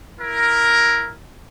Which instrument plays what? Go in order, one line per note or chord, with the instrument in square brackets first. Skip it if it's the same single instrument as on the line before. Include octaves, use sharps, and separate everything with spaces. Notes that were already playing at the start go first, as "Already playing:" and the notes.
[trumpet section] E4 A#4